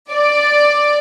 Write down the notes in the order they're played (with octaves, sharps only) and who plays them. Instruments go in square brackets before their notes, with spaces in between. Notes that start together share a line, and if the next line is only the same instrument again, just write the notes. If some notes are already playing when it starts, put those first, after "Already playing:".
[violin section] D5